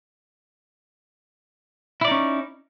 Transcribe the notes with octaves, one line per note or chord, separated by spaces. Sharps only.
C#4 D#4 E4 D5